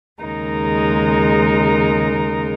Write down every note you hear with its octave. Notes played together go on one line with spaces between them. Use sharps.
D#2 C#3 G#3 D#4 A#4